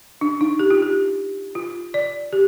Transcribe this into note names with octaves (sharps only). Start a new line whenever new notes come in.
D4
D#4
G4
F4
G4
F4
D5
G4